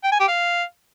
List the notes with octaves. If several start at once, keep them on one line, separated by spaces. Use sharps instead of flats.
G5
G#5
G4
F5